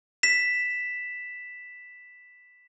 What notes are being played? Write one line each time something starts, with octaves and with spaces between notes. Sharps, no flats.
B6 E7